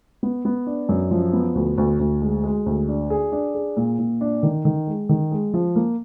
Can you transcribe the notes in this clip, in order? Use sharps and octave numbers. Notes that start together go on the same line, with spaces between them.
B3
B3
D4
F#2
F3
B3
D2
D2
D2
G#3
G#3
D2
D4
G#4
D4
G#4
A#2
A#2
D4
D#3
D#3
G#3
D#3
G#3
F3
A#3